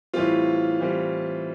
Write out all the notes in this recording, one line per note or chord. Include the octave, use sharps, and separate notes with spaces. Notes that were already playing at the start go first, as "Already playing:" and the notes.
A2 E3 G3 C4 F4 F5
A2 E3 G3 C4